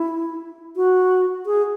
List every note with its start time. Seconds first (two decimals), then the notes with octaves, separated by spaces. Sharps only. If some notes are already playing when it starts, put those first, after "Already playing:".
Already playing: E4
0.76 F#4
1.46 G#4